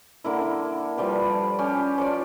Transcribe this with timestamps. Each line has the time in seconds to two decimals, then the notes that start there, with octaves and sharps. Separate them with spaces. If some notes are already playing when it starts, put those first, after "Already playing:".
0.24 D3 A#3 E4
0.97 F3 G3 G4 B4
1.59 C#4 G4
1.98 F3 C#5 D5